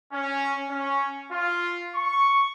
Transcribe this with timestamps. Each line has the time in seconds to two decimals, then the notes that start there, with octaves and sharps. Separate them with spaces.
0.12 C#4
0.69 C#4
1.32 F4
1.95 C#6